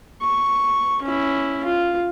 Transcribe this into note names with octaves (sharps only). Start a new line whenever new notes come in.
C#6
C#4 E4
F4